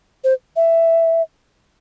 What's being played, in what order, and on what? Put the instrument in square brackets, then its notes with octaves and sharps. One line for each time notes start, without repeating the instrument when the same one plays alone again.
[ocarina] C5
E5